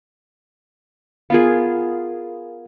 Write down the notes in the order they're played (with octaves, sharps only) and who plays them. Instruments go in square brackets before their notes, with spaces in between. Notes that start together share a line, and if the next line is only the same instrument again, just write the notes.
[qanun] B3 F4 G#4 [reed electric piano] A#4 F5